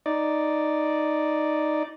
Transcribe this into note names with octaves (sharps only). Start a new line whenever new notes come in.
D#4 D5